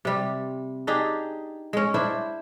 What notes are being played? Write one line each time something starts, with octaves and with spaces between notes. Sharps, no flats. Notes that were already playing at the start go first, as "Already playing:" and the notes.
C3 G3
D4 D#4 G4 G#4
G#3 C#4
D4 E4 C5 E5